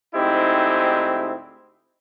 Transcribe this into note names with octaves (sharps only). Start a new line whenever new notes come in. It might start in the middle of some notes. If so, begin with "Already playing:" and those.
D2 G#2 C4 D#4 E4 G4